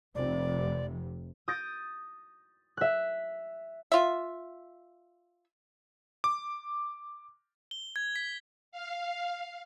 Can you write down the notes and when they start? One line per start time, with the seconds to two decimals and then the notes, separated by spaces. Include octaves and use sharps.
0.15 F1 F2 C3 D5
1.48 D#6 G6 A6 A#6 D7
2.77 E5 F#6
3.92 F4 E5
6.24 D6
7.71 G7
7.96 G#6
8.16 B6
8.72 F5